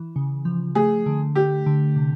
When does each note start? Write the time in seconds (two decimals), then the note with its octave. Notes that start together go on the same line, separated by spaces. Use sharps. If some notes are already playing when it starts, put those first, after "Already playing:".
Already playing: E3
0.16 C#3
0.45 F3
0.75 A3 G#4
1.06 D3
1.35 A3 G4
1.66 D3
1.96 C3